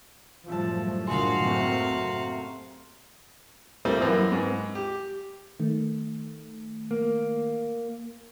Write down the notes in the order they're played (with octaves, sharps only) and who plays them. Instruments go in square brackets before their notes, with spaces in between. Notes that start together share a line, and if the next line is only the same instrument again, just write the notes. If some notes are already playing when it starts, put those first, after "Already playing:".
[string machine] F#2 A2 [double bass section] F3 G3 [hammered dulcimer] E5 A5
[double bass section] C2 A#2 D3 [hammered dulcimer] G#3 C5 C6 [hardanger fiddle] F#4 F5
[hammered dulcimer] C3 A3 A#4 [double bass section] A#3 C4
[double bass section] F#1
[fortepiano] G3 A3 A#3 C4
F#2 E3 A#3 C4
G#2 B4
G4
[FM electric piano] D#3 A3
[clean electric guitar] A#3